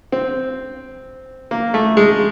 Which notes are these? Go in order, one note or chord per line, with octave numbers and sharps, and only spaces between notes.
C4
A#3
A3
G#3